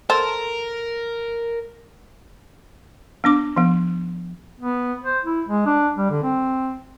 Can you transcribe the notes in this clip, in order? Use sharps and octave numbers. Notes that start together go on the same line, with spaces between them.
A4 A#4 C5
B3 D4 D6
F3 B3
B3
C5
E4
G#3
D4
G3
D3
C4